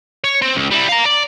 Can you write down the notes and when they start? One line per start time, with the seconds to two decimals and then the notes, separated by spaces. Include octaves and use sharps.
0.24 C#5
0.42 C4
0.55 C#2
0.71 G3 E4
0.88 F5 A#5
1.05 D5